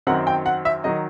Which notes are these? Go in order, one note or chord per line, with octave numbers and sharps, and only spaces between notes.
F#2 D#3 F#3 C4 F#5
G5
F#5
E5
D#3 F#3 D#5